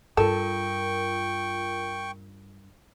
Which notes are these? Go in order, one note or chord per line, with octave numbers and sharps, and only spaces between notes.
G2 F4 A4 A#4 G5 C#6